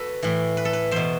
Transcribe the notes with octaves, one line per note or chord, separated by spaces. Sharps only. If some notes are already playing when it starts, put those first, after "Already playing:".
Already playing: F#4 A4 B4
A2 E3
B4
A4
B4
E2 B2 C5